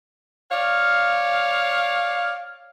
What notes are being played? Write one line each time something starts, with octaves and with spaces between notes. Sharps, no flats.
C#5 D5 F5